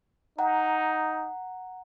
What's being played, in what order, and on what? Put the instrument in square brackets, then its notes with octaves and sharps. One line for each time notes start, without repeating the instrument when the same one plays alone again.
[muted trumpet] D#4 [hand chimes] F#5 G5 A#5